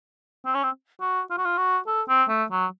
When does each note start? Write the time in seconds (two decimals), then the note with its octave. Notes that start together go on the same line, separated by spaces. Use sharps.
0.45 C4
0.54 C#4
0.63 C4
1.01 F#4
1.30 F4
1.38 F#4
1.45 F4
1.58 F#4
1.87 A4
2.09 C4
2.29 A3
2.51 F#3